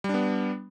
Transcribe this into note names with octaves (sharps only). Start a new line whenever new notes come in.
G3 B3 D4